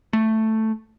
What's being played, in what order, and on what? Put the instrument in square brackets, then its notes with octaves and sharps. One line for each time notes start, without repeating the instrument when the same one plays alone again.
[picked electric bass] A3